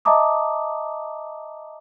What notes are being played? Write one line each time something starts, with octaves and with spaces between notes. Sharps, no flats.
D#5 E5 A5 A#5 D6 D#6